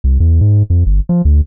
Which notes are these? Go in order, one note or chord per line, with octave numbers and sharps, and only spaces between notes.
C2
E2
G#2
F2
G1
F3
D2